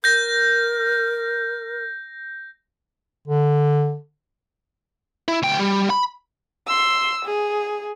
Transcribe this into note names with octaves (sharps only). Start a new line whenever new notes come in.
A#4 G6 A#6
D3
E4
D2 G5
G3
B5
C6 E6
G#4